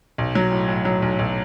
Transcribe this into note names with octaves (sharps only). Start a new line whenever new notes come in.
B1
F#3
A2
A2
F#3
B1
B1